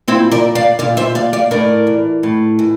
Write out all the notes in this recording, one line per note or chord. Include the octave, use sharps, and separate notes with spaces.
A#2 C4 E4
A#4 D5
D5 F5
A#2 D5 F5
C5 E5
D5 F5
D5 F5
A2 A#4 D5
E3
A2
E3